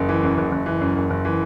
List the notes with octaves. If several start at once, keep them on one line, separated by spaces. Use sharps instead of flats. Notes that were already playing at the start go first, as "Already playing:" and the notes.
Already playing: F#1
E3
F#2
F#1
F#1
E3
F#2
F#1
F#1
E3